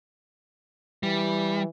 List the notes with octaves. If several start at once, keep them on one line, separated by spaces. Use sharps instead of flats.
E3 G3